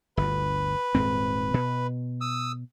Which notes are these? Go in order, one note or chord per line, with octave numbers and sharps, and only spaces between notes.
G1 D2 B4
D#1 G#2 C4
B2
D#6 E6